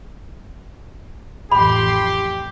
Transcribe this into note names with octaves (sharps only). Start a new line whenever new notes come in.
A1 F2 G4 B5 C6